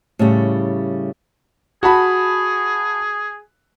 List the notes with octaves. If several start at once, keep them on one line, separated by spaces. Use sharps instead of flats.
A2 C#3 G3
F#4 G#4 A5 B5